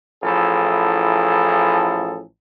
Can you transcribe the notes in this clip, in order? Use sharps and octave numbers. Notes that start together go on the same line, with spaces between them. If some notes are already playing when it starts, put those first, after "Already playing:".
A1 F3 E4 G#4 A4